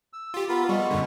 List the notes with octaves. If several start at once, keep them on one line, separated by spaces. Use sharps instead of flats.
E6
F4 G4
B3 F4 A#4 B5
G3 G#3 B3 C#6
F#2 D3